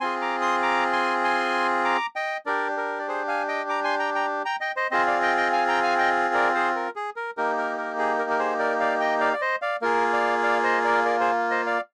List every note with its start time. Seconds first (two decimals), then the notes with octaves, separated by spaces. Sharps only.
0.01 C4 F4 G#4 G#5 C6
0.22 A#5 D6
0.41 C6 D#6
0.62 A#5 D6
0.93 G#5 C6
1.24 G#5 C6
1.85 A#5 D6
2.16 D#5 G5
2.46 D4 G4 A#4 D5
2.77 A#4
2.99 D5
3.08 G#4 C5
3.28 F5 G#5
3.48 D#5 G5
3.69 A#5 D6
3.84 G#5 C6
3.99 G5 A#5
4.15 G5 A#5
4.45 G5 A#5
4.61 D#5 G5
4.76 C5 D#5
4.91 C4 F4 G#4 C5 D#5
5.07 D5 F5
5.22 D#5 G5
5.37 D#5 G5
5.52 F5 G#5
5.68 G5 A#5
5.83 F5 G#5
5.98 D#5 G5
6.34 A#4 D5
6.55 G#4 C5
6.76 A#4
6.96 G#4
7.16 A#4
7.37 A#3 D#4 G4 A#4
7.58 A#4
7.78 A#4
7.98 G#4
8.19 A#4
8.30 A#4
8.39 G#4 C5
8.59 A#4 D5
8.80 D5 F5
9.00 D#5 G5
9.21 D5 F5
9.33 D5
9.41 C5 D#5
9.62 D5 F5
9.82 A#3 F4 G#4 A#4
10.13 D5 F5
10.43 D5 F5
10.63 C5 D#5
10.85 A#4 D5
11.05 A#4 D5
11.20 G#4 C5
11.50 C5 D#5
11.66 D5 F5